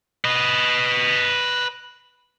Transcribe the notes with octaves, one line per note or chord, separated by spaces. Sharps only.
B4 D#5